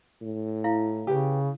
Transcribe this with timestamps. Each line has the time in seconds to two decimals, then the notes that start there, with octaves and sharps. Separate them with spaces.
0.22 A2
0.64 E4 F5
1.07 C#3 G4 B4 G5